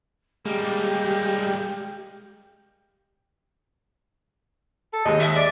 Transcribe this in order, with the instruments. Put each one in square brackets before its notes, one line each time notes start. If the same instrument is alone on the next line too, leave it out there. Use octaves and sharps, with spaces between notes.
[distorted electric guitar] G3 A#3 [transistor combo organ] G#3 [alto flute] G4
[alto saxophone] A4
[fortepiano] D#2 G#3 [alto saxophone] D#5
[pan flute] E5
[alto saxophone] D5